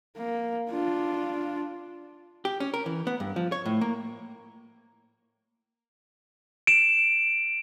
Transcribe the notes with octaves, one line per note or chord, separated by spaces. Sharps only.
A#3
D4 F4
G4
C#4
A#4
E3
B3
G2
F3
C#5
A2
A#3
D7 E7